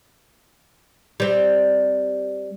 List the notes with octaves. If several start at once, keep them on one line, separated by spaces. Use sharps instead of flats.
G3 C4